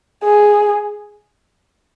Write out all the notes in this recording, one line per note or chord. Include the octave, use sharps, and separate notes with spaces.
G#4